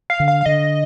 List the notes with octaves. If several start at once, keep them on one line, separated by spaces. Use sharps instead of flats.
F5
D3
F5
F5
D3 D#5